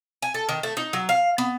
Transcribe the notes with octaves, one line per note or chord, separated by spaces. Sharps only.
G#5
A4
D#3
A3
D#4
F#3
F5
B3